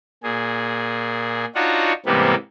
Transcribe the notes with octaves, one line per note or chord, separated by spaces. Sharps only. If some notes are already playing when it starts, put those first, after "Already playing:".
A#2 G#4
D4 D#4 F4 F#4 C#5 F#5
G#2 C3 E3 G3 A#3 B3